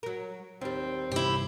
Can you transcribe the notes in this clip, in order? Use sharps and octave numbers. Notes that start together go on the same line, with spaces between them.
F#3 A#4
D#2 G3 C4
G2 C3 E4 G4